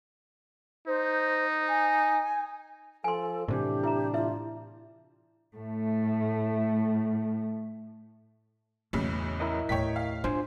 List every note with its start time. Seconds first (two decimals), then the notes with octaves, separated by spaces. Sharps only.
0.87 D#4 C5
1.69 G#5
3.04 F3 A4 G#5 C6
3.48 A2 C3 E3 D4 G4
3.83 E4 E5 A#5
4.14 E4 F4 E5
5.56 A2 A3
8.93 B1 E2 A2 C#3
9.40 E4 A#4 D#5
9.69 D#2 A2 C#5 G5 B6
9.96 F5
10.24 D4 F4 C5 G#5